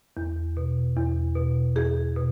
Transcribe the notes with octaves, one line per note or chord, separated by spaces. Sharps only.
E2
B2
E2
B2
E2 G#4
B2